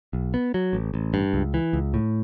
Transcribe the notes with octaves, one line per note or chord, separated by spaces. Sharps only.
B1
B3
F#3
A1
A1
G2
C#2
E3
C#2
A2